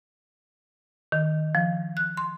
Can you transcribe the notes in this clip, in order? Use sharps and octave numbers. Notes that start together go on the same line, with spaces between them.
D#3
F3
F#6
C6